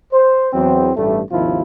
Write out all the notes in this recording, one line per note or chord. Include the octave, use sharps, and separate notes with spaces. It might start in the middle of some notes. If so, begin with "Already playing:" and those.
C5
E2 F#3 C4
A1 G2 G3 A3
G#1 D#2 C3 F3 E4 F4